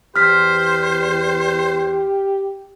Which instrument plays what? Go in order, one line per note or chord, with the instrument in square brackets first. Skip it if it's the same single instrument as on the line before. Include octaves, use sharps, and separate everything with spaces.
[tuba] E2 [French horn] G4 [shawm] C5 [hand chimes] F6 B6